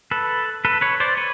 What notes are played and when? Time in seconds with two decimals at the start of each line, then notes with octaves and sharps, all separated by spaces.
0.11 A4 B4
0.65 A4 B4
0.81 B4 C#5
1.00 C5 D5
1.17 B4 C#5